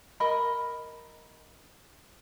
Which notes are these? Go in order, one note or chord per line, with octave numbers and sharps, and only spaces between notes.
A#4 D#5 B5